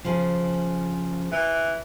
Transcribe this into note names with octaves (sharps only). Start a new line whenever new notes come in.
C#3 F3
E3